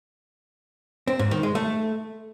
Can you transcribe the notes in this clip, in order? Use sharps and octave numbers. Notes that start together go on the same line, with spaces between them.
C4
G#2
D#3
G#3
A3